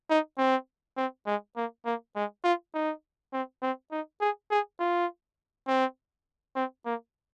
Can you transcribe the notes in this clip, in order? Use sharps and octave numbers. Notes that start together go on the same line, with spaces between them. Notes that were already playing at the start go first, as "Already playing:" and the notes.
D#4
C4
C4
G#3
A#3
A#3
G#3
F4
D#4
C4
C4
D#4
G#4
G#4
F4
C4
C4
A#3